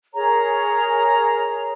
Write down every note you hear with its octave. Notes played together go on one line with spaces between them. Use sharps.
G#4 A#4 C#5 A#5